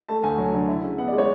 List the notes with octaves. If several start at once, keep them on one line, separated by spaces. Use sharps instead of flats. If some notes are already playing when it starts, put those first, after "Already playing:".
A3 A5
D2 G#5
F#3
D3
E4
C#3
B3 F#5
D5
G#3
C#5